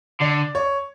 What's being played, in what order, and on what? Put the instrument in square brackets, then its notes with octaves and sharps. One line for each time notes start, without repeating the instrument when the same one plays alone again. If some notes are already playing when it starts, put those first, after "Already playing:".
[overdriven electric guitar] D3 [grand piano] D5
[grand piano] C#5